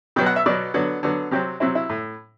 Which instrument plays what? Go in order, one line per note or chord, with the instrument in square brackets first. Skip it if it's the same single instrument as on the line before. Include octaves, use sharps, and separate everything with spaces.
[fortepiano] B2 F#3 B3 G5
F#5
E5
B2 F#3 B3 D5
D3 F#3 B3
D3 F#3 B3
C3 F#3 C4 G4
C3 F#3 C4 E4
E4
A2